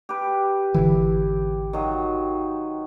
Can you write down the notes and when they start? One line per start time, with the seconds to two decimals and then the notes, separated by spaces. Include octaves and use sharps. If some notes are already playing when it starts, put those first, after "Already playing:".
0.09 G4 B4
0.74 G#1 D3 E3 E4
1.73 D#3 F#3 F4